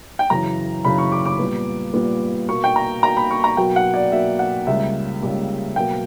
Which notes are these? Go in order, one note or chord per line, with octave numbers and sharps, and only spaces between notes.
G5
F#2 C#3 E3 A#5
F#2 C#3 E3 B5
C#6
D6
D6
A#2 G3 B3
A#2 G3 B3
B2 A#3 C#6
G5
A#5
B2 A#3 A#5
B5
C#6
A#5
B2 F#3 A#3 G5
F#5
D5
B2 F#3 A#3 E5
F#5
C#2 C#3 G3 A#3 E5
C#2 C#3 G3 A#3
B2 F#3 A#3 G5